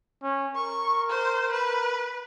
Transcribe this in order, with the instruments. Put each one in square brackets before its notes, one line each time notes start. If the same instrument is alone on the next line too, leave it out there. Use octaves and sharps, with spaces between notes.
[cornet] C#4
[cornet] A#4 [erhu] C#6
[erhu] C5
B4